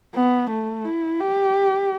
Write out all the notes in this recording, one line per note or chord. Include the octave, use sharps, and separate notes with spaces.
B3
A3
E4
G4